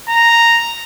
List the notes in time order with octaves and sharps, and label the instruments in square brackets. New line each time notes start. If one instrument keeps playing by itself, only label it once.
[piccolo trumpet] A#5